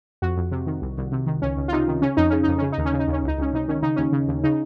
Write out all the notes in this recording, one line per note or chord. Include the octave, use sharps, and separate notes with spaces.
F2 F#4
F2
C3
D#3
C2
C2
C3
D#3
C#2 C#4
C#2
F4
C3 D#4
D#3
C#3 C#4
F2 D#4
C#3 C#4
F2 D#4
C#3 C#4
D#4
D#2
C#4
C#3
D#4
D#2 C#4
C#2 D#4
C#2 C#4
C3 D#4
D#3 C#4
C#3 D#4
D#2 C#4
C#3
D#2
C#3 D#4